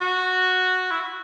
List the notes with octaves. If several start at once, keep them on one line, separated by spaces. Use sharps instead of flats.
F#4
E4
F#4